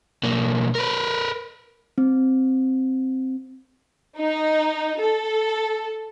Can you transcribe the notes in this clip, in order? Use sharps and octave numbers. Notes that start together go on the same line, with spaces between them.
B1 A#3
A#4 B4
C4
D#4
A4